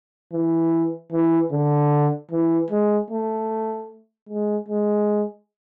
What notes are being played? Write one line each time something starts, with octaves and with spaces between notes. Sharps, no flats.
E3
E3
D3
E3
G#3
A3
G#3
G#3